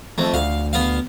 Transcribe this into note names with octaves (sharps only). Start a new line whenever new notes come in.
F2 A3
D2 F5
B3 F5